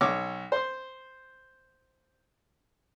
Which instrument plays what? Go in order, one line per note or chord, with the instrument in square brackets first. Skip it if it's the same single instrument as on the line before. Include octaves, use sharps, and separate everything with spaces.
[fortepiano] B1 C#5 C#6 D6
C5 C6